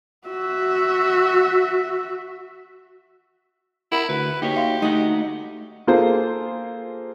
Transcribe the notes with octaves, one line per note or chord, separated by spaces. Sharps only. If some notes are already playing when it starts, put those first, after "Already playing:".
F#4 E5
E4 A#4 F#5 B5
D2 F#4 B4
A#3 D#4 F#4 G4 C#5
E5 F5 C6
A3 D#4 F#4 F#5
A#3 F4 G#4 A4 C5